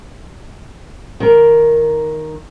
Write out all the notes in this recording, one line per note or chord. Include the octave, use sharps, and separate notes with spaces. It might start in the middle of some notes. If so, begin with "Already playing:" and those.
D#3 A#4